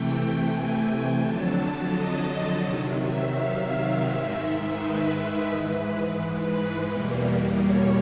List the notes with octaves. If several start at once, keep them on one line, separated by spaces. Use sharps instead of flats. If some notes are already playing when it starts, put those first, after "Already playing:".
Already playing: C3 E3 A3 G5
G#5
F2 D3 F#3 A5
D#5
C3 D#3 F#3
E5
F5
G#2 D#3 G#3 E5
B4
G#2 E3 G#3 B4
E2 B2 G3 A#3
C#5